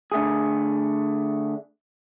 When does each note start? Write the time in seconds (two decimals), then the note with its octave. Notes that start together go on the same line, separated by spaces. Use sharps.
0.12 D3 A3 G#4